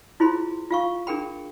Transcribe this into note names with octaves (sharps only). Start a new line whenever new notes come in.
E4 F4 G#4 C5 B5 C6
F4 F5 C#6
D4 G#4 A#4 G5 B5